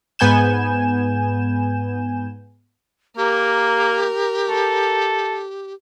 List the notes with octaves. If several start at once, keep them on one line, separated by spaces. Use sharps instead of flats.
G#2 B3 G#5 G6 E7
A#3 G4 A#4
A4